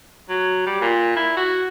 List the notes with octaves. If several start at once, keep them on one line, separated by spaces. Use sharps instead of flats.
F#3
G3
A#2
E4
F#4